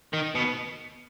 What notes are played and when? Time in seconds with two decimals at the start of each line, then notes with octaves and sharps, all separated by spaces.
0.13 D#3
0.35 B2